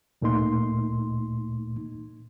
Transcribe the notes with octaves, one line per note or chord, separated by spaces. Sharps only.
D2 A#2 A3 A#3 D#4 C6